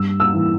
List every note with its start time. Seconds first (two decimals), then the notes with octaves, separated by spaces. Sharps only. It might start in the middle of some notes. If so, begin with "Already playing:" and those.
Already playing: G2 E6
0.20 E6
0.34 E3